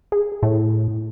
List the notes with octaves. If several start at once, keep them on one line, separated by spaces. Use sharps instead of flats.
G#4
A2